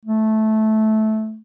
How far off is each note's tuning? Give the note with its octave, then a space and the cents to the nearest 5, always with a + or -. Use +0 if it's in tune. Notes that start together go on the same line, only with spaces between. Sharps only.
A3 -15